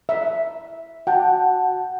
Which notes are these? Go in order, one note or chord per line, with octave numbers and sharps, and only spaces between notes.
E5
F#4 F#5 G5 A5